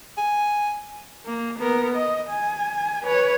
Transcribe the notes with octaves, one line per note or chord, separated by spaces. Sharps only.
G#5
A#3
B3 A#4
D#5
G#5
B4 C#5